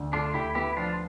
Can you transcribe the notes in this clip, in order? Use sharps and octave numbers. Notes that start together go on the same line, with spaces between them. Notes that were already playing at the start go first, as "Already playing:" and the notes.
Already playing: D2 D3
A3 D4 F4
D2 E4 G4
B3 E4 G4
F3 D4 F4